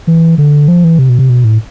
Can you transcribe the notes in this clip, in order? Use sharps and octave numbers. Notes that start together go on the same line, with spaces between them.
E3
D3
F3
E3
C3
B2
C3
B2
A2